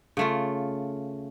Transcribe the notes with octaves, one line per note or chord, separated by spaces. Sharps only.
C#3 A3 F4